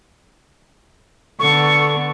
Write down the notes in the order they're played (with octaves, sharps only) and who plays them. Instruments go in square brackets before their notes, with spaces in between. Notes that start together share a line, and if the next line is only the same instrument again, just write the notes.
[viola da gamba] D3 B3 [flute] A4 [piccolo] C#6